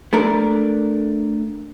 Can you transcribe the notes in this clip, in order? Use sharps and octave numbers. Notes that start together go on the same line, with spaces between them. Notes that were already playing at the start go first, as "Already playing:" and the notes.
A3 D4 A#4